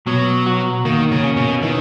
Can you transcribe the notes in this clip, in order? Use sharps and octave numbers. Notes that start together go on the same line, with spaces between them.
B2 F#3
F#4
D#3 A#3
C#3
C#4
B2
D#3 E3